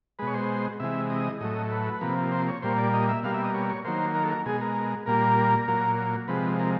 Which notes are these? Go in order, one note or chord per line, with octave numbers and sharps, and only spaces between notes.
B2 G#3 B4
C#5
C5
C3 E3 G#3 E5
D#5
A2 F#3 A3 D#5
B4
C3 F3 A#3
C5
C#5
A#2 G3 A#3 C5
D5
D#5
E5
B2 G3 A#3 F5
E5
D#5
C#5
C#5
D#3 F#3 A#3 C5
A#4
A4
A#4
B2 G#3 G#4
A#4
A#2 G3 A#3 A#4
A#2 F#3 A#3
C3 F3 G#3 B4
A#4